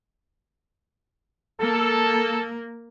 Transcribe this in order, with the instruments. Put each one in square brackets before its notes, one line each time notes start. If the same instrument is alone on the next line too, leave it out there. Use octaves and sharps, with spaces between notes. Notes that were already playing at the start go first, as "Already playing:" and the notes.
[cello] A#3 [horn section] A4